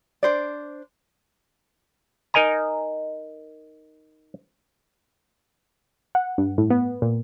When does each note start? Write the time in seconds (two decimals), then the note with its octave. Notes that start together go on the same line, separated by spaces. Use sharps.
0.23 D4 C5 D5
2.34 D#4 A#4 D#5 G#5 A#5
6.15 F#5
6.38 G2
6.58 A2
6.70 B3
7.02 A#2